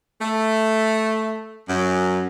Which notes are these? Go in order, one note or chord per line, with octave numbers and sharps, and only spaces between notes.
A3
F#2